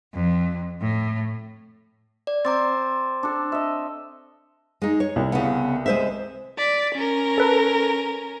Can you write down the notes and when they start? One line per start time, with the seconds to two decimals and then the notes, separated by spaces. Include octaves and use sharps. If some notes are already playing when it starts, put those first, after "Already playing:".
0.14 F2
0.81 A2
2.27 D5
2.45 C4 A#5 D6 A6
3.23 D4 A4
3.52 D#5 E5
4.82 G#3 D#4
5.00 C#5
5.16 C2
5.32 C#3 B3
5.86 G#3 C5 E5
6.58 D5 B6
6.95 C#4 A#4
7.38 A4 B4